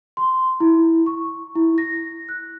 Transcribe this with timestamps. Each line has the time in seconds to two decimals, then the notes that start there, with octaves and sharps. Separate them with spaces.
0.17 C6
0.60 E4
1.06 C#6
1.55 E4
1.78 A#6
2.29 F#6